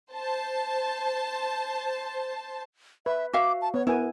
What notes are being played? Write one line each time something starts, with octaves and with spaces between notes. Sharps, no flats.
C5 A5
B4 E5
F#4 E5 F5 D6
A5
B3 C#5
B3 E4 A#4 G#5